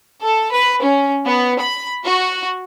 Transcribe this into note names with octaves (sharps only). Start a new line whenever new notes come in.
A4
B4
C#4
B3
B5
F#4